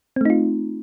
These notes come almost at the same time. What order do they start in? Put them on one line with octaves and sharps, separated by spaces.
C4 A3 D#4 F4